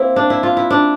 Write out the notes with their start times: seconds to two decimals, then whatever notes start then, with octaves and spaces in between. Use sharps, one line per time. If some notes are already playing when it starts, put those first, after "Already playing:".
Already playing: A#3 C4 E4
0.16 D4
0.30 E4
0.43 F4
0.57 E4
0.70 D4